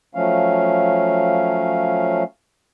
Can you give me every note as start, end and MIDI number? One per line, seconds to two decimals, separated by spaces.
0.15 2.23 53
0.15 2.23 54
0.15 2.23 57
0.15 2.23 61
0.15 2.23 77